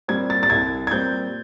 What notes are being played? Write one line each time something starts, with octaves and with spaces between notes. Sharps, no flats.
A#2 G3 C4 G#6
A6
A6
C2 G#6
G#6
A#2 G3 C4 G6